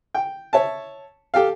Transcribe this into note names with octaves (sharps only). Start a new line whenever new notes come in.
G5
C#5 E5 A5
G4 A4 F5